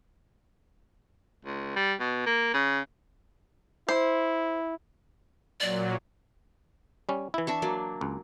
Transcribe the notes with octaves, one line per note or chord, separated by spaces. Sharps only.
C#2
G3
B2
A#3
C#3
E4 C5
A#2 F#3 D5
G3 C#4
E3 E4
D4 E5 C#6
F#3 A#3 D5
C#2